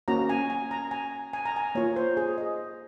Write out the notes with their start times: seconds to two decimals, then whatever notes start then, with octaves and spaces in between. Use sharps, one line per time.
0.08 A#3 C#4 F#4 A#5
0.29 G#5
0.50 G#5
0.71 A#5
0.91 G#5
1.33 G#5
1.46 A#5
1.56 G#5
1.75 A#3 F4 C#5
1.96 C5
2.17 G#4
2.38 D#5